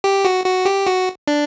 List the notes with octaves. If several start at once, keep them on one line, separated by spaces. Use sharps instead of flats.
G4
F#4
F#4
G4
F#4
D4